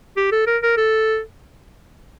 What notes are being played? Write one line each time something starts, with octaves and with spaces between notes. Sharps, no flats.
G4
A4
A#4
A#4
A4